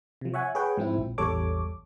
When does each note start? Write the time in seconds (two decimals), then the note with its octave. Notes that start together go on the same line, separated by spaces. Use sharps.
0.21 C3 F3
0.34 C#5 E5 F#5 G#5
0.55 G#4 B4 C#5 F#5 G5
0.77 G#2 F3 C4 E4
0.99 A#1
1.18 A1 E2 G3 A4 C#5 D6